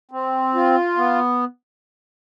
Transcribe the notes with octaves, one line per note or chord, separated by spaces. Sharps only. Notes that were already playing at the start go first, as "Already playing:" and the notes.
C4
F4
B3